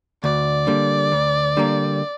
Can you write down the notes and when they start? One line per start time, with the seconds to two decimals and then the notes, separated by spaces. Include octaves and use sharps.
0.24 D2 D5
0.67 D3 G3 A#3
1.12 D2
1.57 D3 G3 A#3